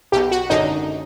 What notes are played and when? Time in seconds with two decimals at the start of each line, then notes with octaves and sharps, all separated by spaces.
0.12 B1 B2 G4
0.31 F#4
0.50 G#1 F#2 D3 D#4